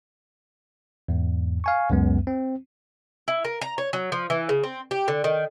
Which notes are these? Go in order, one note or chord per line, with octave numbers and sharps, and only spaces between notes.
E2 G#2
F5 G#5 C#6
C#2 F#2 G#3 B3
C4
E4
A#4
A#5
C#5
F#3
F3
E3
C#3
C4
G4
D3
D#3